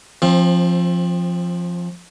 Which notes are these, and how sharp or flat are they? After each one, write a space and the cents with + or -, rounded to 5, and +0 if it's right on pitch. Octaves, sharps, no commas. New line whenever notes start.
F3 +0 C4 +25